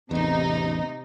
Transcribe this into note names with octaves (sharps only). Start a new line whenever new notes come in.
A1 E2 C3 D#4